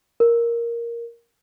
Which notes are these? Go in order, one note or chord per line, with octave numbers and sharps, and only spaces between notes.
A#4